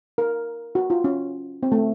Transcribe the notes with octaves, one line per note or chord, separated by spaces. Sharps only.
A#4
F#4
F4
C#4
C4
A3